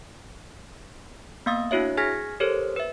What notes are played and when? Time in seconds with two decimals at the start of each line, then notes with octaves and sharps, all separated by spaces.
1.46 A#3 B3 F5 D#6 A6
1.71 D4 E4 F#4 C#5 E5
1.97 G#4 G#5 F6 G#6 A#6 B6
2.40 G4 A4 A#4 C5 C#5
2.76 B4 E5